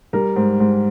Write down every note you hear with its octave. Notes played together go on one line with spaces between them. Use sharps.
G3 A#4
G#2
G#2